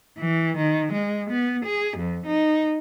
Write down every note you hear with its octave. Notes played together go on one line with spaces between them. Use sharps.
E3
D#3
G#3
B3
G#4
F2
D#4